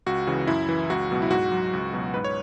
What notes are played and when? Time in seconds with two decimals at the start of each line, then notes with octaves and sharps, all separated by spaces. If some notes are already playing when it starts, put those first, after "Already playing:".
0.06 C#2 F#4
0.27 C#3 E3
0.47 F#2 E4
0.69 E3
0.90 C#2 F#4
1.10 B2 F#3
1.22 E4
1.31 G#2 F#4
1.52 F#3
1.73 C#2
1.93 B2 F#3
2.14 G#2 B4
2.24 C#5